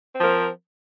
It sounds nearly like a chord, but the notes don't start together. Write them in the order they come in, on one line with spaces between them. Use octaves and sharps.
C4 F3 A#4